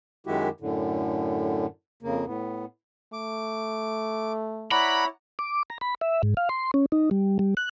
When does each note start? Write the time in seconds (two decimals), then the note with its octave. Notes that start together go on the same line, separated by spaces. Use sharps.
0.27 F#2 D#3 G#3 E4 F#4 G4
0.60 F#2 A2 D3
2.03 F2 C#3 A#3
2.26 A2 B3
3.13 A3 D6
4.71 E4 C#5 D5 F#5 A#5 B5
5.39 D6
5.70 A#5
5.81 B5
6.01 E5
6.23 G#2
6.37 F5
6.49 C6
6.74 C#4
6.92 D#4
7.11 G3
7.39 G3
7.57 F#6